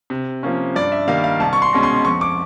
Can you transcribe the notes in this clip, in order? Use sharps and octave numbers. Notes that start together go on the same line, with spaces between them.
C3
F3 A#3 C#4
G2 D5
E5
D#3 G3 A#3 F5
F5
C2 A5
C#6
C6
B2 G#3 C#4
C6
F2 C#6
D6